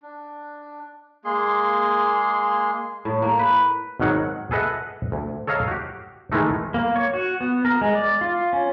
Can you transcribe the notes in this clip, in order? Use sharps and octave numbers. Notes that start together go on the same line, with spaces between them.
D4
G#3 A#3 G#4 C6
A2
A#3
B4
G#1 B2 D#3 F#3 F#5
G#4 A4 B4 D#5 E5 F#5
D2
A4 C#5 D#5 F5 A#5
F#4 G4
D#3 E3 G#3 A3 D#4
A#3
C#5
F#4
B3
A#4
G#3
D5
F4
C#4